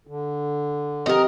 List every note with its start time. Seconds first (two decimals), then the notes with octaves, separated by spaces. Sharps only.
0.07 D3
1.06 F3 C4 G4 A#4 D#5